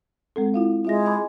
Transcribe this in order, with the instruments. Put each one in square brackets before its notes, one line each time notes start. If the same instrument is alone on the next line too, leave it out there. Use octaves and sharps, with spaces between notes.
[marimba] G#3 C4 A4
E4 F4 F5
[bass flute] G#3 [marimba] F4 E5 A#6
[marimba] G#5 B5 D6